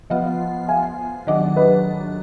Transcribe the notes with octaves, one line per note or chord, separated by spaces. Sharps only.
F3 B3 F4 D#5 F#5
F5 G#5
D#3 F#3 D4 D#5 F#5
B4 D#5